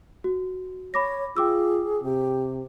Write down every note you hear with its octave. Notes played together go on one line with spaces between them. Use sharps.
F#4
C#5 B5 D6 A#6
F4 G#4 G5 D6 E6
C3 G4